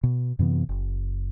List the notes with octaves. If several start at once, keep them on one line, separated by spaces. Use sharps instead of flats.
B2
F#2 C3 E3 B3
F#1